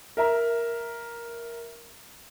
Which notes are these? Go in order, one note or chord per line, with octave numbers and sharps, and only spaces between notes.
A#4 E5 A#5